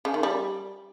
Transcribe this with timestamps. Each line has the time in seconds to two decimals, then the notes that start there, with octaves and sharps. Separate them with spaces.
0.05 C#3
0.14 D#3
0.23 G3